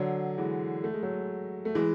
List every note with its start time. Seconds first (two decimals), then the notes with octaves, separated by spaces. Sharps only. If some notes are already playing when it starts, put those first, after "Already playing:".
Already playing: D3 F#3
0.38 E3 G#3
0.84 A3
0.94 G#3
1.03 F#3 A3
1.65 A3
1.75 E3 G#3